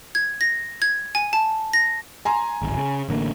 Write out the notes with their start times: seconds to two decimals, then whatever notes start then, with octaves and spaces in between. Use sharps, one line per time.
0.15 G#6
0.41 A#6
0.82 G#6
1.15 G#5
1.33 A5
1.73 A#6
2.25 G#5 A#5 C6
2.62 D1 G#1
2.77 C#3
3.09 A1 D3 A#3